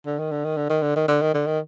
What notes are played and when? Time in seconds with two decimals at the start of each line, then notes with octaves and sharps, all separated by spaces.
0.06 D3
0.19 D#3
0.31 D3
0.44 D#3
0.57 D3
0.69 D#3
0.82 D3
0.96 D#3
1.08 D3
1.21 D#3
1.34 D3
1.46 D#3